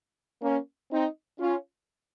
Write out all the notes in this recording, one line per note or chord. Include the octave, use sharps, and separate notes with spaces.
A#3 C#4
C4 D#4
C#4 F4